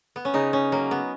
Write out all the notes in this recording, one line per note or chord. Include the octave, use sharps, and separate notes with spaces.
B3
C#4
C#3 D#4
C#4
F#3 A#3
B3